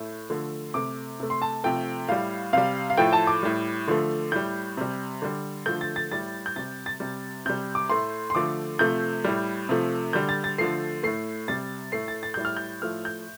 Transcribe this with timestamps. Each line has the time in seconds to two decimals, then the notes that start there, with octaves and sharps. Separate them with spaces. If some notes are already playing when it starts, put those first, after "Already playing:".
Already playing: A2 A3
0.30 D3 F3 A3
0.74 C3 A3 D6
1.20 C3 A3
1.30 C6
1.42 A5
1.64 C3 F3 A3 G5
2.08 A2 G3 F5
2.53 C3 G3 F5
2.90 F5
2.98 A2 F3 A3 G5
3.13 A5
3.27 D6
3.43 A2 G3
3.87 D3 F3 A3
4.32 A2 G3 G6
4.77 C3 G3
5.22 D3 G3
5.66 D3 F3 A3 G6
5.81 A6
5.96 A6
6.11 A2 G3 A6
6.46 G6
6.56 C3 G3 A6
6.86 A6
7.00 C3 G3
7.46 C3 G3 G6
7.75 D6
7.90 A2 A3 C6
8.30 C6
8.35 D3 F3 A3 D6
8.79 C3 F3 A3 G6
9.24 A2 G3
9.69 C3 F3 A3
10.13 D3 G3 G6
10.29 A6
10.44 A6
10.58 D3 F3 A3 C7
11.03 A2 A3 C7
11.48 C3 G3 A6
11.92 A2 A3 C7
12.08 A6
12.23 A6
12.34 A2 G3 G6
12.45 F6
12.57 G6
12.82 A2 F3 A3 F6
13.05 G6